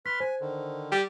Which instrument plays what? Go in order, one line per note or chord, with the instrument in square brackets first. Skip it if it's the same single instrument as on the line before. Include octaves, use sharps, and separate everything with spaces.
[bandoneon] B4 C6 F6 [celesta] B6
[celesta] C5 [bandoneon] G#5
[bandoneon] D3 D#3
[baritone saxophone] G3